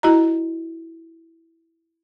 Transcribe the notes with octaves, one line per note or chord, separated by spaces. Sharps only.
E4 F#4 D#5 A#5